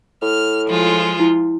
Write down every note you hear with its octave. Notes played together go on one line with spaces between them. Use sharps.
A2 F6
F3 G#3 F4
E4